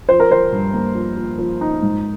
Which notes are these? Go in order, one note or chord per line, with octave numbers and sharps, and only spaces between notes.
F3 C5
A#4
F3 C5
G2
A#3
F3
F3
F3
D#4
G#2